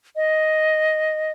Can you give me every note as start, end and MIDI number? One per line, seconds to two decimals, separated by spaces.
0.16 1.32 75